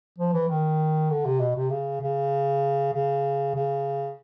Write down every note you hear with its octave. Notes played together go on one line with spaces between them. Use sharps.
F3
E3
D#3
D3
C3
B2
C3
C#3
C#3
C#3
C#3